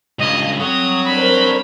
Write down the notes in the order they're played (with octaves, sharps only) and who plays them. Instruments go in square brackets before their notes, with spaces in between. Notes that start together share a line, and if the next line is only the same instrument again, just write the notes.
[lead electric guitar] C#2 G2 [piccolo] D#5
[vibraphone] G3 C4 A4 [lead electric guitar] C#5 F#5 [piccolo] D#6
[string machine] D4 A#4 C5 [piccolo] B5